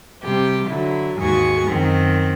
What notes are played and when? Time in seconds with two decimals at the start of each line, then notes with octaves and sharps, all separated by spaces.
0.24 C3 G3 G4
0.69 D3 F#3 E4
1.19 D#2 G#2 F#4 G#4 C#6
1.69 F#2 D#3 C4